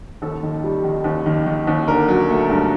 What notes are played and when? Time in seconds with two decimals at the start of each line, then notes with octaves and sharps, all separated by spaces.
0.22 D#2 A4
0.43 D#3
0.64 G3
0.84 D#3
1.04 D#2
1.26 D#3
1.46 D#3
1.67 D#2
1.88 D3 A#4
2.08 F#3
2.30 A3
2.50 G2